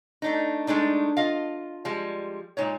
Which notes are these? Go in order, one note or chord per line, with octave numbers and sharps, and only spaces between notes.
A3 D4 D#4
G#3 A3 D4 D#4
F4 D#5 F5
F3 G3 G#3
A#2 G#3 D#4 C#5